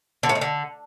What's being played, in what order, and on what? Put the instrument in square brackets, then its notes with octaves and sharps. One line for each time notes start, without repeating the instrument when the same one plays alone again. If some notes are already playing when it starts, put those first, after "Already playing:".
[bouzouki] D3
A2
D#3
D3